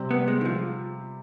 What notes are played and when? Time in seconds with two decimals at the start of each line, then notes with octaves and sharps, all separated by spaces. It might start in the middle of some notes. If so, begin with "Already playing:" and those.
Already playing: C3 G3 C4 G4
0.11 B3
0.28 G#3
0.41 D#3
0.45 F3